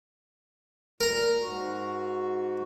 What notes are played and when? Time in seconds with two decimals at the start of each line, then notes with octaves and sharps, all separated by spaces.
1.01 A#2 A#4 A#5
1.41 G#2 F#4